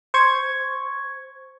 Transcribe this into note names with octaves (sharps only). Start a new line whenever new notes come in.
C5 C#6 G#6